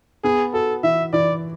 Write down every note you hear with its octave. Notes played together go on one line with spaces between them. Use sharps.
B3 G#4
F#4 A4
E3 E5
E3 D5